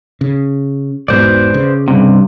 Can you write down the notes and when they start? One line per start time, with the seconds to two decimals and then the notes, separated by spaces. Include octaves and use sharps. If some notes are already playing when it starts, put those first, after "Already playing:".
0.21 C#3
1.08 E1 G#2 B2 B4 C5 D5
1.54 C#3
1.88 G2 C3